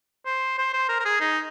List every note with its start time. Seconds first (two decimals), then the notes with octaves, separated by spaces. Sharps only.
0.26 C5
0.58 C5
0.73 C5
0.89 A#4
0.99 A#4
1.05 G#4
1.20 D#4